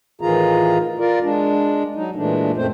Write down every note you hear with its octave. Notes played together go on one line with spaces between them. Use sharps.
A2 D#3 E3 F4 G#4 A#5
F4 A#4 D5
G#3 D4
F#3 D#4
A#2 E3 G#3 A3 D4
F#2 A#2 A3 C4 C5